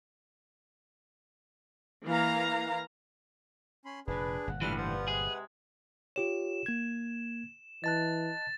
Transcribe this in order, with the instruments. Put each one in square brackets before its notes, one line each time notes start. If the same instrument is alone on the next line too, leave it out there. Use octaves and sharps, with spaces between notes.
[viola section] E3 A#3 F5 A#5
[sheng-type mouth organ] C#4 B5 C6
[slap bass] F1 A#2 [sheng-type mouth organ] D4 G#4 [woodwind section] B4
[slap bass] G1 A#2 [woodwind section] F#5
[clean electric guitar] A2 D3 E3 [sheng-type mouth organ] D4 F4 F6 [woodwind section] G4 B4
[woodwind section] G2 F3 [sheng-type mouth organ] B4 F#5
[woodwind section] C3 G#3 [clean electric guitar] G#4
[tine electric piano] F4 G4 C#5 [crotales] E7
[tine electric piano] A#3 G#6
[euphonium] E3 [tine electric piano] D#5 A5 F#6 [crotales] A6